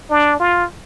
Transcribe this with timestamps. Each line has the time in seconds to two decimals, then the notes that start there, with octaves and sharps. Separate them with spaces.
0.11 D4
0.40 F4